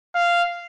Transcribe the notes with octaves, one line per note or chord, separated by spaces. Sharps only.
F5